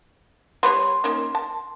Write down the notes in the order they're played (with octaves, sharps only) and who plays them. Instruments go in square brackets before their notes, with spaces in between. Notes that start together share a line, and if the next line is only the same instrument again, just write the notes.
[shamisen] G3 B4 C#5 [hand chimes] C6
[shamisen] A#3 C#4 D#4
A5